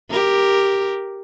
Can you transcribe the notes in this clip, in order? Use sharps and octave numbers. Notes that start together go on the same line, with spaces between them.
G4 A#4